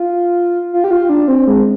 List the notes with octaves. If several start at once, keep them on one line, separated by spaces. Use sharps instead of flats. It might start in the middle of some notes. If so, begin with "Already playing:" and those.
Already playing: F4
F4
G4
F4
D4
C4
G#3